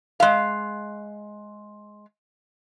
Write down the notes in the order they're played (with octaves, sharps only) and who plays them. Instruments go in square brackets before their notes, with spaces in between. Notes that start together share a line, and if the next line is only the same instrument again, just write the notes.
[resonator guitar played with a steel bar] G#3 F5